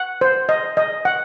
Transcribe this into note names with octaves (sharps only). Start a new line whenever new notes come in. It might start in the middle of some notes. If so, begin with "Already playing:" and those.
Already playing: F#5
C5
D#5
D#5
F#5